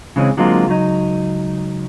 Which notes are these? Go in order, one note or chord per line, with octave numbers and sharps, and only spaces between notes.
C#3 E3 G#3 C4 C#4
D3 F#3 G#3 A#3 C4 F4
C#2 F#3 D#4